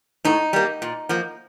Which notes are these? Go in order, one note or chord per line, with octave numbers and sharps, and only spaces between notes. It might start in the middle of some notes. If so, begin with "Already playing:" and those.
A2 D#4
G3 A#3
A#2
F3 A#3